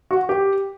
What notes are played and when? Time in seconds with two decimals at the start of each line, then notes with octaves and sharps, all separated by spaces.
0.11 F#4
0.29 G4